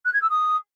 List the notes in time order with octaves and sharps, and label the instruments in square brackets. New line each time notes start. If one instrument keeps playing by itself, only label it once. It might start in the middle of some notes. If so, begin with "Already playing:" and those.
[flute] F#6
G#6
E6
D#6